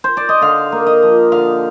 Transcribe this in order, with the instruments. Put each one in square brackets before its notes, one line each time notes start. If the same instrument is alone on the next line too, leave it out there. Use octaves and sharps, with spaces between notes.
[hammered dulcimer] C5
D5
D#5
D3 F5
A#3
D#5
F3
D3 F5